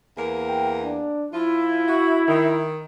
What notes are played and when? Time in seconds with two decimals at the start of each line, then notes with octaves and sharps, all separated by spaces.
0.17 E2 A#3 A#4
0.48 G5
0.84 D4
1.34 F3 E4 F4
1.88 F#4
2.28 D#3